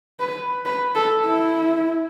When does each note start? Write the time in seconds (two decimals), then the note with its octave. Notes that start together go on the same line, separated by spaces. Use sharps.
0.20 B4
0.65 B4
0.95 A4
1.25 E4